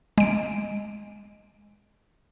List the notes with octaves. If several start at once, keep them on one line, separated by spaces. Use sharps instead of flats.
G#3 D7